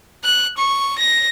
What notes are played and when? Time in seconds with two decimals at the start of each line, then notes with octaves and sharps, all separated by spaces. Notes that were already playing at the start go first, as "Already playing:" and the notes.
0.24 F#6
0.57 C#6
0.98 A#6